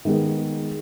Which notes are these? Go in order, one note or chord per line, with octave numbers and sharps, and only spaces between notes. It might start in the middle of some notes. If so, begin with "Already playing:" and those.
D#3 G#3 B3 G#4